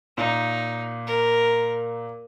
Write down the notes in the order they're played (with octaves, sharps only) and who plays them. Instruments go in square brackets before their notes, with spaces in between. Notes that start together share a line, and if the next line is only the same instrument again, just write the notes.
[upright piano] A#2 [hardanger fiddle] D#4
[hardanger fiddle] A#4